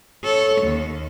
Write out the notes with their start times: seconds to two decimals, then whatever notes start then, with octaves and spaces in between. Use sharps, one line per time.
0.24 A4 C#5
0.62 D#2